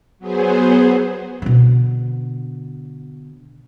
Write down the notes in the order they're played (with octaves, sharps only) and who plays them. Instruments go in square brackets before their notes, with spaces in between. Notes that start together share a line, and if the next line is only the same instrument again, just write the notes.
[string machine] F#3 B3 G#4 C5
[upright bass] B2 D3